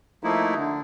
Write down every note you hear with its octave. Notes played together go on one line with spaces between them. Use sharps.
F3 A3 A#3 D#4 E4
D3